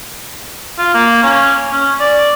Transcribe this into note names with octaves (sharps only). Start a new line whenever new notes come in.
F4
A#3
C#4
C#4
D5